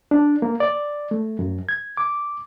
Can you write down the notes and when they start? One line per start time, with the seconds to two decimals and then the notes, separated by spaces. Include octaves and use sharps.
0.11 D4
0.42 A#3
0.60 D5
1.11 A3
1.39 F#2
1.69 G#6
1.97 D6